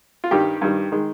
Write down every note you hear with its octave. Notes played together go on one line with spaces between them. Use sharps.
F4
G2 D#3 G3 G4
G2 D#3 G3
D#3 G#3